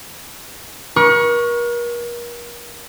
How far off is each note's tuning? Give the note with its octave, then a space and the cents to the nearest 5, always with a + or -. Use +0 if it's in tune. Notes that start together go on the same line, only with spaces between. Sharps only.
A#4 +40 C#6 +0